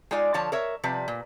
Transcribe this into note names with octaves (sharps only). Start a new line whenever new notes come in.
G#3 D#4 F4 D5 G#5
D3 F3 C#5 A5
A#4 C#5 E5
C3 F3 G3 B4
A#2